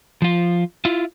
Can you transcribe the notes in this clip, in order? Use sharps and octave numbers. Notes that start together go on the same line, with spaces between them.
F3 F4
E4 F4